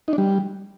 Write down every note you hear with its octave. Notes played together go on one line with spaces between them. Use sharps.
D#4
D4
G3